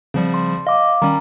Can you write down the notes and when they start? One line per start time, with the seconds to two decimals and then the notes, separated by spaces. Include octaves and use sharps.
0.14 C#3 F3 G3 C4
0.34 C6
0.67 D#5 F5 D6
1.02 D#3 G3 C#4 A#5